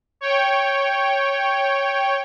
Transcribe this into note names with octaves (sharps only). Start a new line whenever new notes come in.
C#5 G5